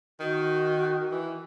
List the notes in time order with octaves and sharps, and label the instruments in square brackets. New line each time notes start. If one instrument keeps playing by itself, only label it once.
[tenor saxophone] D#3 [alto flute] F#4
[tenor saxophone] E3